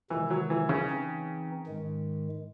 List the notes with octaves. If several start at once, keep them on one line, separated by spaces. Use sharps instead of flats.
C3 D#3 E3 G#3
F#3
E3
C#3
E3 C4 D#4
G#2 D#3 G#3